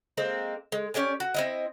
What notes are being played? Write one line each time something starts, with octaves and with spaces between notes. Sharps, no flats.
G#3 A#3 C4
G#3
C#4 G4 D5 G#5
F#4
C4 E4 D#5